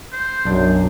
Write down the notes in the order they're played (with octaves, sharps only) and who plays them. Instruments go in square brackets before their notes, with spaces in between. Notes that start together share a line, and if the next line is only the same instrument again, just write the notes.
[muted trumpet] C5
[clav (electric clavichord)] B1 D4 [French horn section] F#2